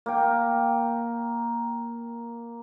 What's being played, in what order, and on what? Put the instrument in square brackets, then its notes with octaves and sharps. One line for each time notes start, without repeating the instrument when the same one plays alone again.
[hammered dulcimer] A#3 G5